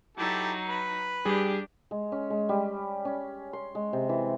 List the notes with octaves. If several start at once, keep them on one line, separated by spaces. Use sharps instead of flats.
F#3 D#4 E4 G4 A4
B4 B5
G3 D4 G4 G#4
G#3
C#4
G#3
G3
C#4
C6
G#3
C3
E3